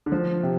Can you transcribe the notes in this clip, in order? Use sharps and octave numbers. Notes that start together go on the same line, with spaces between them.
D3
F3
C3